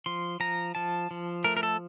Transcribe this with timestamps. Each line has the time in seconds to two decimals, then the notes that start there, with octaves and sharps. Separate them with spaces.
0.06 F3 C6
0.40 F3 A#5
0.75 F3 A5
1.11 F3
1.44 A3 A#4
1.57 A#4
1.63 A4